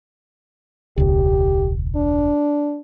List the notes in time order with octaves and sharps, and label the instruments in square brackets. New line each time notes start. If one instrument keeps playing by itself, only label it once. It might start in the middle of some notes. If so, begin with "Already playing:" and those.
[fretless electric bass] E1 C#2 [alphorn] G4
[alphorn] D4